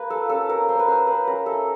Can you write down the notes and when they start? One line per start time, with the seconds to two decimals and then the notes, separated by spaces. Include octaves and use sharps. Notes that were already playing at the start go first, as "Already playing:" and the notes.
Already playing: A#3 B4
0.10 F4 A4
0.29 C#4 A4
0.49 A#3 A#4
0.69 A#3 C5
0.79 B4
0.88 C#4 C5
1.07 C#4 B4
1.27 C#4 A#4
1.46 E4 A4